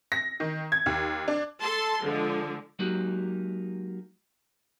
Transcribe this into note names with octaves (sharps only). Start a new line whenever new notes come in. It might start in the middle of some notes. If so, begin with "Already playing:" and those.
A#6
D#3
G#6
D#2
D4
A4 A5 C6
D3 F3 G#3
F#3 G#3 A#3 D#4 F#4 G4